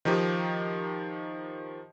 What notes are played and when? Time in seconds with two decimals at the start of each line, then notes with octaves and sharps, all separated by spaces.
0.05 D#3 F3 D#4 G4